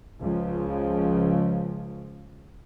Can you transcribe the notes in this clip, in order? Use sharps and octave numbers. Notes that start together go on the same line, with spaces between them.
C#2 C#3 F3